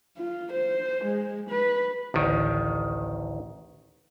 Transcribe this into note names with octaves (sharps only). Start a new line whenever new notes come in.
F4
C5
G#3
B4
A1 D2 D#3